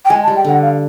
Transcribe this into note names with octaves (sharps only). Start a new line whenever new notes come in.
G5
G#3 G#5
A5
G3
G5
D3 F#5
F5